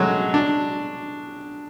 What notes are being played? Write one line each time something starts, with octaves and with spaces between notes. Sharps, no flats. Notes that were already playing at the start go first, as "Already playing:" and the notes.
Already playing: F#3 G#3 A3
D4